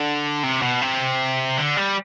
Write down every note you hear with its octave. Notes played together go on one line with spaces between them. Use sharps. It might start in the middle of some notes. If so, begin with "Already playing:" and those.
Already playing: D3
C3
B2
C3
D3
G3